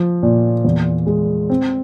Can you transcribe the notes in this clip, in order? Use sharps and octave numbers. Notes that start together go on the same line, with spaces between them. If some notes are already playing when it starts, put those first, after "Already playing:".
Already playing: F3
A#2
E2
G#3
C4